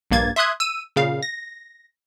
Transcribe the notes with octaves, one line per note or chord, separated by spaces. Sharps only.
A#1 G2 A#3 G#6 A6
E5 C6 D#6 F#6 G#6
E6 D#7
A#2 C#3 F5
A#6